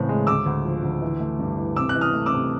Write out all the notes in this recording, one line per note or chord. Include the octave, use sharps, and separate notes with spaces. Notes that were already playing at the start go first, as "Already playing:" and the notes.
Already playing: A2 C#3 E3 C4
G#3
D2 D6 E6
D2
F3
D2
E3
A3
G2
E3
C3 D6 E6
F#6
E3
D#6 F6
A3
D6 E6
C3